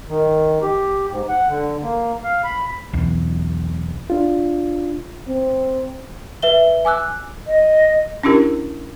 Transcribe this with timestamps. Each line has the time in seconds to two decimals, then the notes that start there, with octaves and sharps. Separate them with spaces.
0.09 D#3
0.62 G4
1.11 G#2
1.29 F#5
1.48 D3
1.83 A#3
2.24 F5
2.44 B5
2.93 B1 E2
4.10 D4 F4
5.28 C4
6.42 B4 E5 G7
6.85 G#5 D6 E6 F#6
7.47 D#5
8.23 C#4 D4 E4 G4 A#4